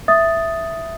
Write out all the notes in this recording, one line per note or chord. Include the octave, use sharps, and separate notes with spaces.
E5 D#6 A6